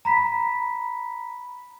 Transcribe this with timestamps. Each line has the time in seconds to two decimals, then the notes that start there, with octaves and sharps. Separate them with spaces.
0.05 A#5 B5 B6